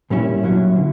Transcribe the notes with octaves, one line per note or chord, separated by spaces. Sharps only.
A#2 G3 C#4 E4
A#2 F#3 C#4 E4
D3